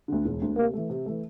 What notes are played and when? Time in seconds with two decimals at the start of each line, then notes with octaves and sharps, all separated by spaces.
0.08 D2 D3
0.25 E1
0.42 D2 D3
0.57 C3 A#3
0.73 E3 A3
0.90 C3
1.06 E3 A3